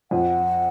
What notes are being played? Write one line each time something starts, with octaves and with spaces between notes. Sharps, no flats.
F2 F3 F#5